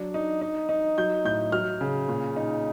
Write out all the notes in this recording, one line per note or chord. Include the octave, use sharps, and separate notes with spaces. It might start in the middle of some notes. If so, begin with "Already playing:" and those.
Already playing: F#3 D4
D#4
D#4
D#4
F#3 G6
A2 G6
F#3 F6
C#3
A#2
D#4